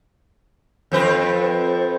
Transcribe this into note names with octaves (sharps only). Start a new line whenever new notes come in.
F2 C4 B4